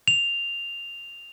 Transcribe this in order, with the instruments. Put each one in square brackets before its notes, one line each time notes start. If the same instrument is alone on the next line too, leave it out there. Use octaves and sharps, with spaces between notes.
[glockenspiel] F7